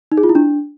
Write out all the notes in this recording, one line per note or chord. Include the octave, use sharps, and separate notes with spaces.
D#4
G#4
F4
E4
D4